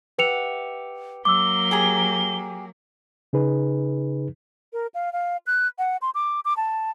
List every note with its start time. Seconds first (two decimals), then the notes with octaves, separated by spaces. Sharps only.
0.19 G4 B4 E5 F#5 C#7 F7
1.25 F#3 A#3 D6 E6 G7
1.71 G4 G#4 A#5
3.33 C#3 D#4 G#4 B4
4.73 A#4
4.94 F5
5.13 F5
5.47 F#6
5.79 F#5
6.02 C6
6.15 D6
6.45 D6
6.57 A5